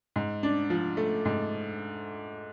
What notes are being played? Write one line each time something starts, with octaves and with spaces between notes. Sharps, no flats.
G#2
D4
F3
A3
G#2